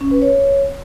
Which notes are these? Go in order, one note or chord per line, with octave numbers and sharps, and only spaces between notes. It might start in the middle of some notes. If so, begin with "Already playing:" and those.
C#4
B4
C#5